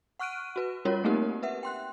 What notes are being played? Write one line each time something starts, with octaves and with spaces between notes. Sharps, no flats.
F#5 C#6 F6 F#6 D7 D#7
F#4 B4
G3 C#4 F4 F#4 A#4 C#5
A3 A#3 C4 D#4 G4 A#4
B4 E5 F#5
G5 C6 F#6